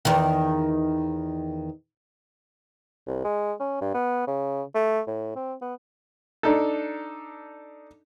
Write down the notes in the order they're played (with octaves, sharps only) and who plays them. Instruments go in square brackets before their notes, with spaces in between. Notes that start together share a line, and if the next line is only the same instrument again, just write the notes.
[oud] E2 D#3
[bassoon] C2
G#3
C#4
G2
B3
C#3
A3
A2
C4
B3
[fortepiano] D4 D#4 A4